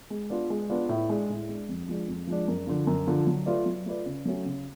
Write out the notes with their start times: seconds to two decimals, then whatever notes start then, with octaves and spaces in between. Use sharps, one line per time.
0.10 G#3
0.30 B3 D4 F4
0.50 G#3
0.69 B3 D4 F4
0.89 A2
1.09 G#3 D4
1.29 A2
1.49 G#3 D4
1.69 F2
1.88 F3 G#3 D4
2.08 F2
2.27 F3 G#3 D4
2.48 F#2
2.67 D3 F3
2.87 F#2
3.07 D3 F3
3.27 F#3
3.46 A3 F4 B4 D5
3.65 F#3
3.86 A3 F4 B4 D5
4.06 C#3
4.25 F#3 A3 C#4 F#4
4.45 C#3